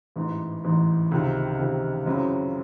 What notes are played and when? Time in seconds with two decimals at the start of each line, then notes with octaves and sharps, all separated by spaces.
0.16 A1 G#2 E3
0.64 A1 G#2 E3
1.12 C#2 C3 D#3
1.59 C#2 C3 D#3
2.06 F#2 C#3 F#3 C4 E4